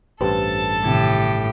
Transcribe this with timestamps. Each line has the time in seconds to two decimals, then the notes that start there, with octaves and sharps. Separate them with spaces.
0.21 A1 G2 G4 A4 B4 C5 A5
0.84 A2 C3 D#3 G4 G#6